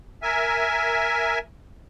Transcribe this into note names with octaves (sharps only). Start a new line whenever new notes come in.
A#4 E5 G#5